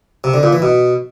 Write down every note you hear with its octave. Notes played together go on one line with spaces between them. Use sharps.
C3
D3
A#2
E3
B2